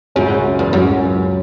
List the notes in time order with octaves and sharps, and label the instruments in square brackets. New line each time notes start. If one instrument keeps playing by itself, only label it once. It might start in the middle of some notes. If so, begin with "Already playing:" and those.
[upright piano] C#2 C#3 F#3 C#4 [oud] F#2
[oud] E2
[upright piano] C#2 C#3 F#3 C#4 [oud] F#2